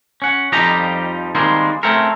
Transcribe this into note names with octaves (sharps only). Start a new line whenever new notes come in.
C#4 F#5
F2 F3 G3 D#4 G4 A#5
D#3 G3 G#3 A#3 C4
A3 C4 C#4 A4 A#4